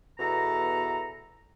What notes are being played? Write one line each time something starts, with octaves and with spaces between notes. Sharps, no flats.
E2 B2 A4 A#5